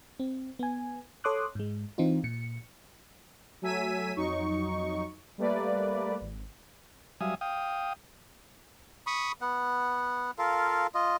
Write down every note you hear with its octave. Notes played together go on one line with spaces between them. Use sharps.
C4
B3 G#5
A4 C#5 C6 D6 D#6 F#6
G#2 G#3
E3 C4 D#4 F4
A#2 C#7
F#3 A3 G#5 E6 B6 D#7
F2 F#3 D#4 C#6
G3 A3 A#3 B4 D5
G#1
F#3 G3 E5 F5 G#5 D#6
F5 G5 D#6
B5 C#6 D#6
B3 F#5
F4 A4 A#4 F5
F4 D#5